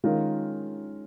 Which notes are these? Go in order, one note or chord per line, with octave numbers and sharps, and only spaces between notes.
D#3 G#3 C#4 F4 A#4